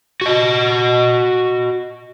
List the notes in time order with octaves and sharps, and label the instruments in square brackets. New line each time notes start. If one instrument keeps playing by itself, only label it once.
[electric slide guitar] F#4 D#5